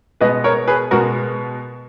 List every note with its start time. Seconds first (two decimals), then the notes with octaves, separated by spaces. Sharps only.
0.21 B2 G#3 B3 B4 D#5
0.44 A#4 C#5
0.68 G#4 B4
0.91 B2 G#3 B3 F#4 A#4